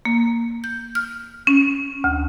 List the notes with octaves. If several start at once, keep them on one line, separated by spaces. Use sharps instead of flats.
A#3
G6
F6
C#4
D2